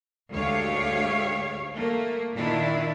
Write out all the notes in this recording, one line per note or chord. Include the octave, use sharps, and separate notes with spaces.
D2 G#2 G4 C#5 F5
A3 A#3
A#2 D#3 D4 E4